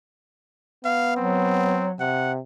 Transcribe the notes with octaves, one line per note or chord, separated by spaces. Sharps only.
B3 F5
F#3 C4
C3 F#5